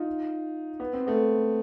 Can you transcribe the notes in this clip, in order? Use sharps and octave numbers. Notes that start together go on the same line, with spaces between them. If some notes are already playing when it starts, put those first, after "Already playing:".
Already playing: D#4 F4
B3
C4
A3 B3